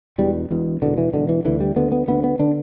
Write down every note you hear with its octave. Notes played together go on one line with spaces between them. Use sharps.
E1 E2 B2 G3
E1 E2 B2
E1 E2 B2 D3
E3
E1 E2 B2 D3
E3
D2 D3 E3
G3
D2 D3 B3
B3
D2 D3 B3
B3
D3 D4